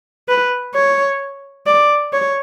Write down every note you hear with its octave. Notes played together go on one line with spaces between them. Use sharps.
B4
C#5
D5
C#5